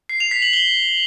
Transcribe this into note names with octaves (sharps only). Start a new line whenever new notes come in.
C7
F7
B6
F#7
G7